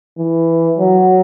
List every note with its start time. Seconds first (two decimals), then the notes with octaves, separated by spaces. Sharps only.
0.18 E3
0.78 F#3